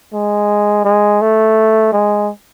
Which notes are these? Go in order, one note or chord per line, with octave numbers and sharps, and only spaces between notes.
G#3
G#3
A3
G#3